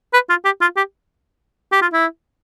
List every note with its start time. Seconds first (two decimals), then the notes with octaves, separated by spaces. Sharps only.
0.14 B4
0.30 F4
0.45 G4
0.61 F4
0.77 G4
1.72 G4
1.82 F4
1.93 E4